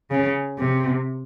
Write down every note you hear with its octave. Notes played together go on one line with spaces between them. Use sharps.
C#3
C3